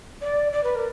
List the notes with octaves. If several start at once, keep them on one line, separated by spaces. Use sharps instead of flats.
D5
D5
B4
A#4